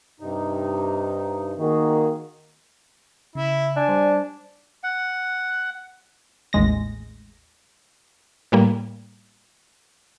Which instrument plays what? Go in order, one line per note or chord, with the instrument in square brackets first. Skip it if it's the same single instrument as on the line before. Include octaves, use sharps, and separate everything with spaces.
[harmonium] G2 C3 D#4
[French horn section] D#3 A#3 [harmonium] F#4 G#4
[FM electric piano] C#3 [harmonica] E4
[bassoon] D4 [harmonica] G#5
[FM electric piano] G3 C5 D5
[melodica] F#5
[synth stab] A1 D#2 G#3 A#6
[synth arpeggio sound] A2 G3 A#3